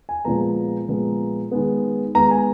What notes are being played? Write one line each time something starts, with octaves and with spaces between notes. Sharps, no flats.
G#5
A#2 F3 G#3 B3 A#5
A#2 F3 G#3 B3
D#3 G#3 B3
D#3 G#3 B3 A#5
G#5